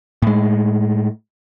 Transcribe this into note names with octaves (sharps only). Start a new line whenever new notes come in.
A2 G#3